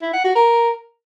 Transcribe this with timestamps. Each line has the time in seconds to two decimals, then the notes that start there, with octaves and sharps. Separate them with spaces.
0.02 E4
0.13 F#5
0.24 F#4
0.36 A#4